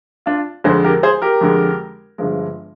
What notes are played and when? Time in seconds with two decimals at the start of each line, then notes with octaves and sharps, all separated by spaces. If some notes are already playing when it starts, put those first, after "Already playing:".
0.26 D4 F4
0.64 F2 D3 G#3 G#4 C5
0.84 G4 A#4
1.03 G#4 C5
1.22 G4 A#4
1.41 F2 D3 G#3
2.18 G1 G2 F3 G#3